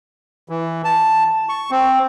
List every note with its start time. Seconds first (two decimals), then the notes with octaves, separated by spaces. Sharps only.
0.49 E3
0.85 A5
1.49 C#6
1.71 C4